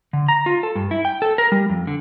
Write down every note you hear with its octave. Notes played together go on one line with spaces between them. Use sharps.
D3
A#5
F4
A4
G2
E4
G5
A4
A#4
G3
F2
D3